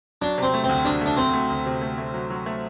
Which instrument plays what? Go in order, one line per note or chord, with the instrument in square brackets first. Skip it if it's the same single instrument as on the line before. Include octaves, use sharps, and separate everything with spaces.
[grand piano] F#3 [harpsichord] D4
[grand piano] C3 [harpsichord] C4
[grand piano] A3
[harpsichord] C4
[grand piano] D2
[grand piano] C3 [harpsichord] D4
[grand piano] A3 [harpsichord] D4
[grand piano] A3 [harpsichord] C4
[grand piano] A3
D2
C3
A3
A3
F#3
F#3
A3